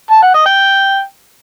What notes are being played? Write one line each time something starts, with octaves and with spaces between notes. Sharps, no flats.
A5
F#5
D#5
G5